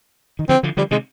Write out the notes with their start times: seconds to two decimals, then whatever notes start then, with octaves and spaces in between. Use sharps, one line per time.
0.39 D#3
0.49 D3 F3 C4
0.63 D3 F3
0.77 D3 F3 G3
0.91 C3 D#3 G#3